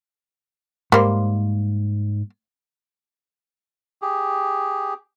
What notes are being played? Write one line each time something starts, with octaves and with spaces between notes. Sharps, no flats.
G#2 G3 A#3 C5
G4 G#4